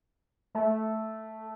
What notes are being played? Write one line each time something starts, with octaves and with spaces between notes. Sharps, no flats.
A3